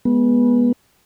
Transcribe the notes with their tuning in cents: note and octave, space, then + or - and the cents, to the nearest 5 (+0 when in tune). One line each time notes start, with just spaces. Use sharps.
G#3 +0 B3 -20